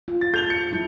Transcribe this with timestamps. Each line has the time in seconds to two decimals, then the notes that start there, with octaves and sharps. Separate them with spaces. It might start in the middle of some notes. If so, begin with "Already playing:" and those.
0.08 F4
0.21 A6
0.34 A4 G6 F7 G7
0.50 C#7
0.71 F3 G3 E4